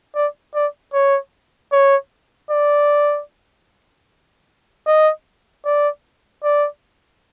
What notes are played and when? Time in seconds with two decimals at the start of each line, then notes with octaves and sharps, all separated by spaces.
0.15 D5
0.55 D5
0.93 C#5
1.72 C#5
2.51 D5
4.87 D#5
5.65 D5
6.44 D5